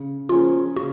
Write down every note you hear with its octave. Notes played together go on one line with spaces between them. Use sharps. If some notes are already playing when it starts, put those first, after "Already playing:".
Already playing: C#3
F3 A#3 C#4 F4 G#4
C#3 F#4